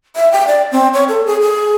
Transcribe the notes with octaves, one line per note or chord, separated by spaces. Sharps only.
E5
G5
D5
C4
C#5
A4
G#4
G#4